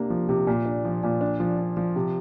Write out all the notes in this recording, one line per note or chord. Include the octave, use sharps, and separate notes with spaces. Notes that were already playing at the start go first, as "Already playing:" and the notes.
Already playing: C3 A#3 D4
F3
C3
A#2
D4
F3
A#2
D4
F3
D4
F3
C3